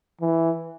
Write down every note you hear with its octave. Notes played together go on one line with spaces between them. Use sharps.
E3